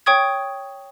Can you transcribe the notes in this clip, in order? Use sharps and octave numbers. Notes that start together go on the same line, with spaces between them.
C#5 G5 C#6 D#6 G#6